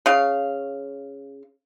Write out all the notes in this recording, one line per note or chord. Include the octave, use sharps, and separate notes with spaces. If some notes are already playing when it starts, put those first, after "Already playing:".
C#3 F5